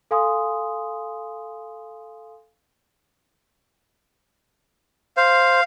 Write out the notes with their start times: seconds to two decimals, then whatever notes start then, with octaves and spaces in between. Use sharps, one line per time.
0.11 A4 F5 G#5 C6 D#6
5.17 C5 F5